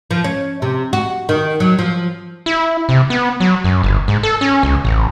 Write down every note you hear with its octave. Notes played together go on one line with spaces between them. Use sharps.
F3
C#4
C3
F#4
D#3
F#3
F3
E4
C3
B3
F#3
F#2
G1
G#2
A4
C#4
C#2
A1